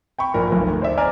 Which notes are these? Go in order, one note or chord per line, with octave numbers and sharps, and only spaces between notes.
G5 B5 C#6
A#1 A#2 A#4 B5
F1 B1
D2
C5 D5 E5
C5 D5 D#5 G#5 A#5 F6